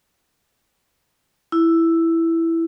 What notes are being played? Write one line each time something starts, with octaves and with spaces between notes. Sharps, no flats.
E4